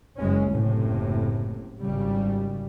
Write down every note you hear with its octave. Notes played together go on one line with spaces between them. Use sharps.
F#1 G#3 C#4
F#1 A2 C3
G#1 C#3 G3